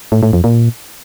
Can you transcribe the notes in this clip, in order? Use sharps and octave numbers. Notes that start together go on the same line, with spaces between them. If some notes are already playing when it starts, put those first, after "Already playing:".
A2
A2
F2
A#2